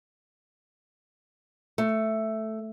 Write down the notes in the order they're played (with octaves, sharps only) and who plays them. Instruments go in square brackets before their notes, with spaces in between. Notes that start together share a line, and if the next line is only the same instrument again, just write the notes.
[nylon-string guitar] A3